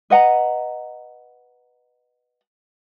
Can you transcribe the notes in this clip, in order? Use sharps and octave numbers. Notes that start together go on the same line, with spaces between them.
B4 D#5 F#5 A#5